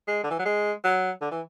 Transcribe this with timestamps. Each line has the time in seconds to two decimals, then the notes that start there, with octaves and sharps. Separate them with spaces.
0.07 G#3
0.24 D3
0.31 E3
0.39 F#3
0.45 G#3
0.84 F#3
1.21 D3
1.31 E3